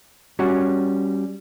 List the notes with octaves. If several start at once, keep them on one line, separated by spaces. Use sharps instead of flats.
G3 C#4 F#4